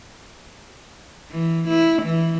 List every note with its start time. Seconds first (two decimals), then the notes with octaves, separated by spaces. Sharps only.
1.31 E3
1.68 E4
2.03 E3